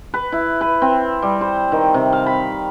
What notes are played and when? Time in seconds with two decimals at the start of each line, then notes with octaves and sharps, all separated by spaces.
0.14 B4
0.32 E4
0.61 B4
0.82 C4
1.22 G3
1.41 C5
1.72 D#3
1.94 C3
2.13 F5
2.26 B5